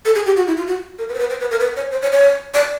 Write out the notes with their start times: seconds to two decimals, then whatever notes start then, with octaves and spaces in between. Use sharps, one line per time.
0.05 A4
0.15 G#4
0.26 G4
0.37 F#4
0.47 E4
0.57 F4
0.67 F#4
0.99 A#4
1.09 B4
1.14 C5
1.19 B4
1.30 C5
1.40 B4
1.51 A#4
1.60 B4
1.77 C#5
1.92 C5
2.02 C#5
2.13 C#5
2.54 D5